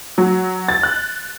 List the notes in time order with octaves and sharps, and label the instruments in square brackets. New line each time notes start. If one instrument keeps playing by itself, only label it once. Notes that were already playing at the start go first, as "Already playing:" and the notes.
[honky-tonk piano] F#3
A6
F#6